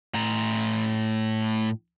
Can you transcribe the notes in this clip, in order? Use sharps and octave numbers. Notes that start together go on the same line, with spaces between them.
A2 A#5